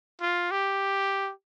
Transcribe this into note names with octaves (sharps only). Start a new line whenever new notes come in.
F4
G4